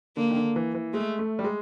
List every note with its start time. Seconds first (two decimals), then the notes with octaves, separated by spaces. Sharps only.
0.17 D3 A#3
0.31 D#3
0.36 D3
0.56 E3
0.74 E3
0.94 G#3 A3
1.19 A3
1.39 G3
1.44 G#3